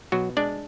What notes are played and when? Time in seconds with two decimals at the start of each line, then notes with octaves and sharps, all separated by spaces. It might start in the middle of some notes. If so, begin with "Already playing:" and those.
0.12 B2 F#3 F#4
0.37 G#3 D4 D5